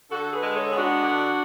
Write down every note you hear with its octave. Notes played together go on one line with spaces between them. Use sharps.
D3 F#4 A4
G#4 B4
G#3
A4 C#5
B3 G#4
D4 F#4
D3